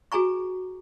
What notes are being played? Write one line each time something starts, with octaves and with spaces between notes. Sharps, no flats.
F#4 G#4 G#5 A#5 C#6